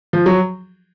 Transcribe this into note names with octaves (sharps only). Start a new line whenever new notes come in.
F3
F#3